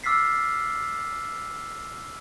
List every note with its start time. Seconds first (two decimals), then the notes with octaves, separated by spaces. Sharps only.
0.04 D6 E6 F6 A6 B6 C7